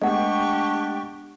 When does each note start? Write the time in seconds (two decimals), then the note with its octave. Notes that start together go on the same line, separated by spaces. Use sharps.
0.02 G#3 A3 B3 D4 G4 D#5 F#5 C#6